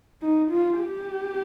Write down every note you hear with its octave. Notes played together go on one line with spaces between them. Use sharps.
D#4
F4
G4